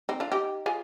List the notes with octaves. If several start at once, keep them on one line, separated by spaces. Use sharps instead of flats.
C4 D#4
D4 F4
D#4 G4
F4 G#4